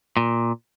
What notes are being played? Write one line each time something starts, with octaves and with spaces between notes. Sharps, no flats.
A#2